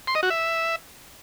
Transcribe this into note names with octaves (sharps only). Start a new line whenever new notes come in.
C6
D#5
F#4
E5